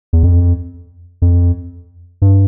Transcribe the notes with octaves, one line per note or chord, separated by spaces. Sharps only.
E2
F2
F2
G2